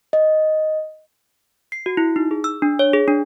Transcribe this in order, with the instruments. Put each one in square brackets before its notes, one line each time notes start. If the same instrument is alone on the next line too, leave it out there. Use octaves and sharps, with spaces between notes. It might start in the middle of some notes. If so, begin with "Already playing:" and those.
[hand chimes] D#5
[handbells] C7
F#4
E4
D#4
G#4
E6
D4
C#5
G#4
D4